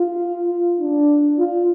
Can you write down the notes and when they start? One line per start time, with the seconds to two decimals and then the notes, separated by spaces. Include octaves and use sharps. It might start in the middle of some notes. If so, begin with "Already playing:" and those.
Already playing: F4
0.80 D4
1.38 F4